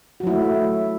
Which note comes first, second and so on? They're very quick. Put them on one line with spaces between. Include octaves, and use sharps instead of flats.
F#4 F#3 E4 A3